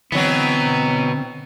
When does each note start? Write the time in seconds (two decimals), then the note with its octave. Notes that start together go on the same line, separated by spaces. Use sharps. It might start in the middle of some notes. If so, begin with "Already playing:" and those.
0.12 B2 D3 E3 F#3 B3 C4